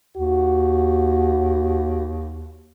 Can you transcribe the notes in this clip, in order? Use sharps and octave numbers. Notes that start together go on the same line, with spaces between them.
D#2 F#4